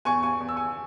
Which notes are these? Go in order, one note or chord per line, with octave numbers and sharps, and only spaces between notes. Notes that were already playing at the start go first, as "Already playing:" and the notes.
E2 G#5 C#6
G#5 C#6
E2
E6
G#5 C#6